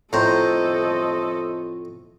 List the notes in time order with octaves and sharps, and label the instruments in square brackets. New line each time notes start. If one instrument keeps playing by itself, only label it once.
[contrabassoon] F2 [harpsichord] A2 [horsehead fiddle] A4 D#5 [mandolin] C5 A#5